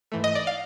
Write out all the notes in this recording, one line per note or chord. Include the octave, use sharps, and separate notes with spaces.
G#2 E3 A3
D#5
D5
F5